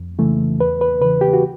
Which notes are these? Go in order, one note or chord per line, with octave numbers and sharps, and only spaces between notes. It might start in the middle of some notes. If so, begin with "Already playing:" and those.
Already playing: F2
C#3 E3 A3
E2 B4
B4
C#3 E3 B4
G4
F#4